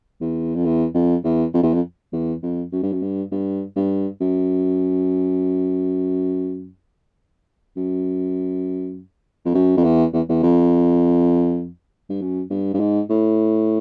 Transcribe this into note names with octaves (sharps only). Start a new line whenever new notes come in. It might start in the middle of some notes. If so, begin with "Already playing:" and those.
E2
F2
E2
F2
E2
F2
E2
F2
E2
F2
F#2
G2
F#2
G2
G2
G2
F#2
F#2
F2
F#2
F2
E2
E2
E2
F2
G2
F#2
G2
G2
G#2
A2